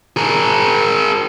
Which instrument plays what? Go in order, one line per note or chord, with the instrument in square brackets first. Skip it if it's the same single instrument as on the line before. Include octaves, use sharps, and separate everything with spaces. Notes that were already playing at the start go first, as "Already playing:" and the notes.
[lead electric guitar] G#4 A#4